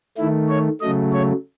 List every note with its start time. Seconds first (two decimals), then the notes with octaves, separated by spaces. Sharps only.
0.18 D#3 A3 E4
0.49 C#5
0.81 C#3 F#3 A3 D#5
1.13 C#5